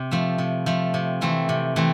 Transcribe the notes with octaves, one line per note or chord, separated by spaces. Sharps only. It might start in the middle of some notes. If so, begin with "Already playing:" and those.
Already playing: C3
F3 A3
C3
F3 A3
C3
E3 A3 C4
C3
E3 A3 C4